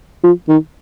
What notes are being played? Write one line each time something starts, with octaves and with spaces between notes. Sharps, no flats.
F3
D#3